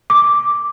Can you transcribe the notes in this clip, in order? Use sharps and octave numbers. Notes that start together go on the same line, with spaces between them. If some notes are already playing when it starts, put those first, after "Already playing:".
D6